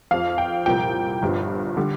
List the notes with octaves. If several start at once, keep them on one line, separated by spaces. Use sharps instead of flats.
F2 F3 F5
G5
C2 A#2 F3 G5
G1 G2 F3
D3 G3